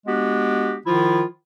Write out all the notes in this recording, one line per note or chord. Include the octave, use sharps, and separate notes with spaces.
G#3 B3 D4 F#4 G4
D#3 F3 E4 F4